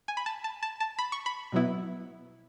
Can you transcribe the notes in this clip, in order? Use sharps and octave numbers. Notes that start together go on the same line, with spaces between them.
G#5
B5
A5
A5
A5
A5
B5
C#6
B5
B2 F#3 B3 E4